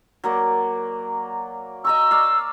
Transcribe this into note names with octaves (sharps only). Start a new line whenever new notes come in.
F#3 A#3 D5
D#5 A#5 C#6 E6
D5 F5